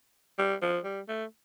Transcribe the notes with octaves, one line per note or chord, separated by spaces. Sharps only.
G3
F3
G3
A3